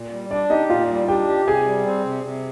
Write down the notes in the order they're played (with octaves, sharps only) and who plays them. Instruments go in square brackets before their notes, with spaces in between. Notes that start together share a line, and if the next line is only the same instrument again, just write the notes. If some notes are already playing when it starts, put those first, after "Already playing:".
Already playing: [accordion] A#2
G3
[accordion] D4 [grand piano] D5
[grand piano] D#4 D#5 [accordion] G4
[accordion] A#2 [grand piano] F4 F5
[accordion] G3
[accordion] D4 [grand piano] G4 G5
[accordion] G4
[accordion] C3 [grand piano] G#4 G#5
[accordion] G3
C4
C3
C3